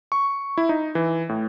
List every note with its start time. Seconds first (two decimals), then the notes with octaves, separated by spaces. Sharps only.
0.12 C#6
0.57 E4
0.69 D#4
0.95 E3
1.29 A2